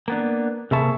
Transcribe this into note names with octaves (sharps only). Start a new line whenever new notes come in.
A#3 B3 D4
C3 A#3 G#4 E5 A5 C#6